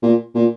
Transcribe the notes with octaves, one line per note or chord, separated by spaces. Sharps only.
A#2
A#2